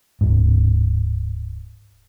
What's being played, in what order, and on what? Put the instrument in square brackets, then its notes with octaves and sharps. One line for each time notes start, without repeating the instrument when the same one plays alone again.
[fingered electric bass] D1 G#2